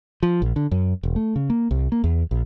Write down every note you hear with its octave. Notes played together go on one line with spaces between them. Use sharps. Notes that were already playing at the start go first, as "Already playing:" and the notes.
F3
A#1
D3
F#2
E1
A3
C#3
A#3
C2
A#3
E2
A#1